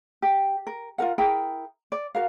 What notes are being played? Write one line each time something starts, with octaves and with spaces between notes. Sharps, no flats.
G4
A#4
F4 F#4 A#4 F#5
E4 G#4 A#4 G5
D5
F#4 A#4 F5